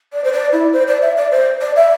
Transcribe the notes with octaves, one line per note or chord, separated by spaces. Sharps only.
D5
C5
D5
E4
C5
D5
E5
D5
C5
D5
E5